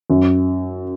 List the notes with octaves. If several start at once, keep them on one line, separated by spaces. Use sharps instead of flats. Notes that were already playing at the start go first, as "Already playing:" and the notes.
F#2